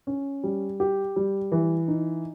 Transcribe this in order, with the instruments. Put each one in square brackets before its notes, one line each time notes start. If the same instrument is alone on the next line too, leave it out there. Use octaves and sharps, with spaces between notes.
[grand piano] C#4
G3
G4
G3
E3
D#4